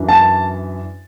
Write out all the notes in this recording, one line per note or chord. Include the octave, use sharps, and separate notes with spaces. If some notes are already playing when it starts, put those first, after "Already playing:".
Already playing: F#2 E3 D4
A5